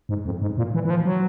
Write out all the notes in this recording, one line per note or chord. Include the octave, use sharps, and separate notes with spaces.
G#2
F2
G#2
A#2
E3
E3
F3
F#3